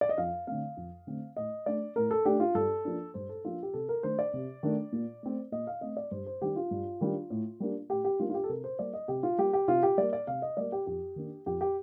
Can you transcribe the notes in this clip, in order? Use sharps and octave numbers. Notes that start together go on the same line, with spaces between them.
D5
D#5
F2 F5
D3 A3 C4 F5
F2
D3 A3 C4
A2 D#5
A3 D4 D5
A2 A#4
A4
A3 D4 G4
F4
G2 A4
F3 A#3 D4
G2 C5
A4
F3 A#3 D4 F4
G4
C3 A4
A#4
D#3 A3 D4 C5
D5
C3
D#3 A3 D4
A#2
A3 C4
A#2 D#5
F5
A3 C4 D#5
D5
G2 C5
C5
D#3 G3 D4 G4
F4
G2
D#3 G3 D4
A2
G3 A#3 D4
A2 G4
G4
G3 A#3 D4 F4
F4
G4
A4
C3 A#4
C5
G3 A#3 D5
D#5
C3 G4
F4
G3 A#3 G4
G4
C3 F4
G4
G3 A#3 D5
D5
C3 F5
D#5
G3 A#3 D5
G4
F2 G4
D#3 A#3 D4
F2 G4
G4